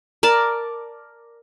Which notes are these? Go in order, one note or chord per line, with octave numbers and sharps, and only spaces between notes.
A#4 D5 A5